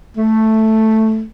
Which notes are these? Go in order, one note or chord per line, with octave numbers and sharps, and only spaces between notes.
A3